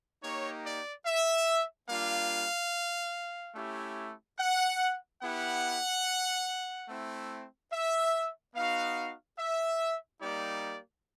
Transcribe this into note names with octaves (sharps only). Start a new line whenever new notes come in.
A#3 D#4 G4 C#5
D5
E5
G3 A#3 D4 F4 F5
A3 C#4 E4 G4
F#5
B3 E4 G4 F#5
A3 C4 E4
E5
B3 D#4 F#4 F5
E5
G3 A#3 D#4 G4 D5